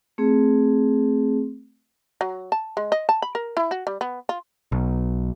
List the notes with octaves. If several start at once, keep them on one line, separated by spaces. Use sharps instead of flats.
A3 C4 G#4
F#3
A5
G#3
D#5
A5
B5
A#4
E4
F#4
G3
B3
F4
B1